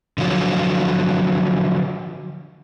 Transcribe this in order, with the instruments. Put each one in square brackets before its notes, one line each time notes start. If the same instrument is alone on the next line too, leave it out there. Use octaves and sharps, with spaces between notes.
[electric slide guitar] D3 F3 F#3